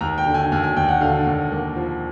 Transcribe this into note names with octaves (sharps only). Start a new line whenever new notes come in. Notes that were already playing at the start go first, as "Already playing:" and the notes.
D#2 A#5
G5
D3
G#5
D#2 G#5
G#5
D#2 G5
F#5
D3 F5
D#2
A#3
F3